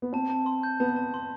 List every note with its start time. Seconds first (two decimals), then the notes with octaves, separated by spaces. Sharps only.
0.02 B3
0.13 C4 A5
0.30 A5
0.46 C6
0.63 G6
0.80 B3 A5
0.96 A5
1.14 C6